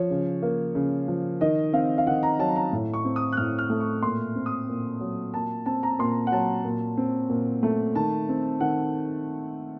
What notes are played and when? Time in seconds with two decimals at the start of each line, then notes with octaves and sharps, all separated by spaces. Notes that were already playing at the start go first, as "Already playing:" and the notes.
Already playing: F3 C#5
0.10 C#3
0.42 A#3
0.75 C#3
1.08 F3
1.41 D#3 D#5
1.73 C4 F5
1.98 F5
2.07 D#3 F#5
2.23 A#5
2.39 F#3 A5
2.56 A#5
2.72 A2
2.94 C#6
3.05 C4
3.16 D#6
3.32 F#6
3.37 A2 F6
3.58 F6
3.70 A3
3.80 C#6
4.02 A#2 C6
4.35 C4
4.46 D#6
4.68 A#2
5.01 F#3
5.34 A#2 A5
5.66 C4 A5
5.83 A#5
5.99 A#2 C6
6.27 F#5
6.32 F#3 A5
6.64 A#2
6.97 C4
7.29 A#2
7.63 A3
7.95 D#3 A5
8.29 C4
8.60 D#3 F#5